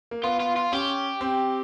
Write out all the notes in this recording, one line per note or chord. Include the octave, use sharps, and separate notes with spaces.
A#3
B3 F4
F4
F4
C#4 G4
C4